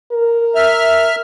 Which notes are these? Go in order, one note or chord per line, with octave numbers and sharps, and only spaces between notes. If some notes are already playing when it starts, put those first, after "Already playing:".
A#4
E5 F6